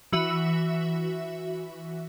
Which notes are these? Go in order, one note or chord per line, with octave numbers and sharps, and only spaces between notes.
E3 F#4 E5